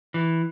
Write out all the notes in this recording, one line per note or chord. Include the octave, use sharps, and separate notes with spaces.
E3